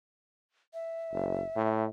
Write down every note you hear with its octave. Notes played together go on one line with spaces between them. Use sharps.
E5
F#1
A2